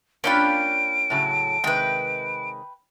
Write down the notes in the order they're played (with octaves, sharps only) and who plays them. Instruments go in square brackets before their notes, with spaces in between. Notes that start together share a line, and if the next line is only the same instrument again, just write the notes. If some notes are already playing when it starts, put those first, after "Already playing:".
[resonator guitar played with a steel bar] A#3 D4 F4 [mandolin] C#4 G5 B5 [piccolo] D7
[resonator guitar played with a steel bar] A2 C#3 F#3
[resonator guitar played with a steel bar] C3 D#3 G#3 [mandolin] B4 G5